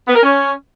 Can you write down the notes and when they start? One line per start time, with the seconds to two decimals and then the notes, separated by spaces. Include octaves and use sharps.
0.08 B3
0.15 A#4
0.23 C#4